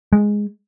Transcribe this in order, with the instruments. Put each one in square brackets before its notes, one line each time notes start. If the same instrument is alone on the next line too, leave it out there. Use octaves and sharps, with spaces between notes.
[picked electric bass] G#3